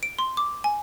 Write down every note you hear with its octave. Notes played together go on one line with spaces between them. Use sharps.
D7
C6
D6
G#5